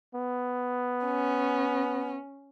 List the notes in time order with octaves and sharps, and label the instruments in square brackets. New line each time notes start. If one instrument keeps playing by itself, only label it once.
[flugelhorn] B3
[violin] C#4